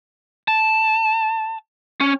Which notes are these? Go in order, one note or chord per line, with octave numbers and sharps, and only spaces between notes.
A5
C#4